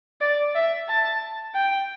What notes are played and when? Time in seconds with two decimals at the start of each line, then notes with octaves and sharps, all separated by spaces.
0.21 D5
0.54 E5
0.88 A5
1.55 G5